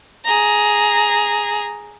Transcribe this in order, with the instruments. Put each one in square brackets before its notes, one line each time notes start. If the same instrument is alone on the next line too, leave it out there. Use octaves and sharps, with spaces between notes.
[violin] G#4 A#5